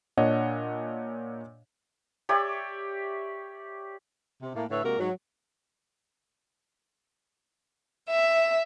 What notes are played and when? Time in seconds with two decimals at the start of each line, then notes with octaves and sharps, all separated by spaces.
0.17 A#2 D4 C#5 D#5 F#5
2.29 G4 C#5 D5 E5
4.42 C3
4.55 A2 A#3
4.70 A2 D3 B4 C#5 E5
4.84 C3 G#3 A#3 F#4 A#4
4.98 G#2 F#3
8.09 E5